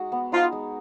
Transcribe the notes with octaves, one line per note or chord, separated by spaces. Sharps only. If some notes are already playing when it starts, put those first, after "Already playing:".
Already playing: G#3 D#4 F#4
B3
D#4 F4
G#3